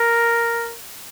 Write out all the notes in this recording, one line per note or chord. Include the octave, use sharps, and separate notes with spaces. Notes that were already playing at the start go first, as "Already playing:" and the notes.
Already playing: A#4